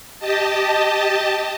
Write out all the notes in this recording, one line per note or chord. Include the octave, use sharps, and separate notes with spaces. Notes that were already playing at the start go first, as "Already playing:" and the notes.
G4 D#5 A5